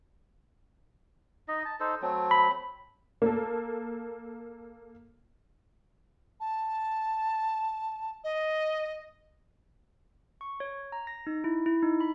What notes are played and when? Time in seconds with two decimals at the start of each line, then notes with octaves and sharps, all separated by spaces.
1.48 D#4 D#5
1.65 A5
1.80 D#4 A4 C5
2.02 F#3 A3 C4
2.31 B5
3.22 A#3 A4
6.40 A5
8.24 D#5
10.41 C#6
10.60 C#5
10.92 A#5
11.07 A#6
11.27 D#4
11.44 E4
11.66 E4
11.82 D#4
12.01 B5